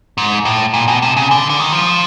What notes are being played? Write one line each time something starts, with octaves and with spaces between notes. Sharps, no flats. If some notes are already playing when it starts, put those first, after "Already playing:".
G#2
A2
A#2
B2
C3
C#3
D3
D3
D#3
F3